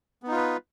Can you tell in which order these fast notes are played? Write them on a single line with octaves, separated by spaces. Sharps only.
B3 D#4 F4 B4